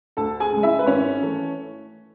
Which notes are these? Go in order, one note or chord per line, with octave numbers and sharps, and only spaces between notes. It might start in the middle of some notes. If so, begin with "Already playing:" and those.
D2 A4 A5
G#4 G#5
C#3 G#3
E4 E5
B4
G#1 C#4 C#5
E3 A3